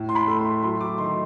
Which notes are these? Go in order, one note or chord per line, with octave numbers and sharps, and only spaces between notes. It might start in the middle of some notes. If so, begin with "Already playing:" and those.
Already playing: A2
C6
B5
A3
C6
F#3 C6
D6
D#3 C6